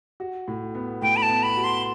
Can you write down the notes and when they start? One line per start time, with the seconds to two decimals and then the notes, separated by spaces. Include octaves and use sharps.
0.20 F#4
0.48 A2
0.75 B3
1.02 A2 G5
1.17 B5
1.22 A5
1.30 B3
1.43 B5
1.57 F#4
1.64 C6